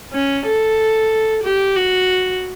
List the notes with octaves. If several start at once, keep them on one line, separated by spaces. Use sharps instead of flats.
C#4
A4
G4
F#4